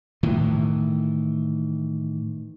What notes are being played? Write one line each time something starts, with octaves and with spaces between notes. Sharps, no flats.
A2 D#3 E3